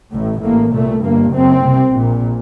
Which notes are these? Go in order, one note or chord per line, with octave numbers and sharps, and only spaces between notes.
A1 A2
A1 A2 A#3
C2 A#2 A3
G1 G2 A#3
F#1 F#2 C4
C2 C3
A#1 A#2